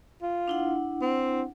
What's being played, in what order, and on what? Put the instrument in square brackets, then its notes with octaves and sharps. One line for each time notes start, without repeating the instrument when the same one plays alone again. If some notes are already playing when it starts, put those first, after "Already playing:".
[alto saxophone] F4
[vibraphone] D4 E4 F#5
[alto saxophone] C4